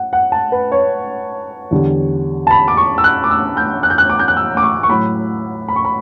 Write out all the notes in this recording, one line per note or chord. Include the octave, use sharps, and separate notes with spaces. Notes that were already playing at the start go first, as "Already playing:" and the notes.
Already playing: F#5
F#5
A5
B4
C#5
E2 D3 G3
A5
B5
D6
C#6
E6
F#6
D6
E6
G6
F#6
G6
F#6
D6
G6
F#6
E6
D6
C#6
C#6
A2 F#3 B5
B5
C#6
B5